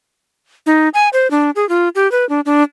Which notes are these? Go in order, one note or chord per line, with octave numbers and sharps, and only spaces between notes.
D#4
G#5
C5
D4
G#4
F4
G4
B4
D4
D4